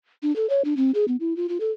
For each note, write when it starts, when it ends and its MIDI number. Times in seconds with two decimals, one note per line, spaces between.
0.23 0.34 62
0.36 0.49 69
0.50 0.62 73
0.65 0.76 62
0.77 0.91 60
0.95 1.05 68
1.08 1.16 59
1.20 1.36 64
1.37 1.47 65
1.49 1.58 65
1.60 1.71 69